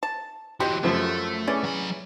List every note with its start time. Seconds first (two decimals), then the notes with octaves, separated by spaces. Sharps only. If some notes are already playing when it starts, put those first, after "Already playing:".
0.03 A5
0.60 E3 F#3 G4 D#5 C6
0.83 F#2 F3 A3
1.47 E3 C#4 G#4 D5
1.63 F#3 B5